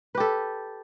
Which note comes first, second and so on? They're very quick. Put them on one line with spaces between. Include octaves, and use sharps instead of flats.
B4 G4 A4